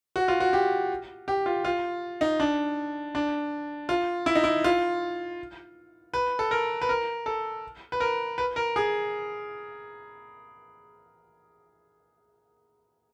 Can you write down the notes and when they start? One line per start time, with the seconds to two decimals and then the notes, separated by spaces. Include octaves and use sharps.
0.16 F#4
0.28 F4
0.40 F#4
0.53 G4
1.28 G4
1.46 F4
1.65 F4
2.21 D#4
2.40 D4
3.15 D4
3.89 F4
4.26 E4
4.35 D#4
4.44 E4
4.64 F4
6.14 B4
6.39 A4
6.51 A#4
6.81 B4
6.89 A#4
7.26 A4
7.92 B4
8.00 A#4
8.38 B4
8.56 A#4
8.76 G#4